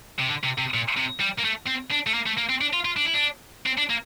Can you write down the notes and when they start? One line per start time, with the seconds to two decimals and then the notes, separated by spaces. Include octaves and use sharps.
0.19 C3
0.28 D3
0.44 C3
0.58 C3
0.74 A#2
0.97 C3
1.20 G3
1.39 A#3
1.45 A3
1.67 C4
1.92 D4
2.07 A3
2.14 A#3
2.26 A3
2.37 A#3
2.49 C4
2.61 D4
2.73 F4
2.85 F4
2.97 D4
3.05 E4
3.14 D4
3.66 C4
3.78 D4
3.90 A#3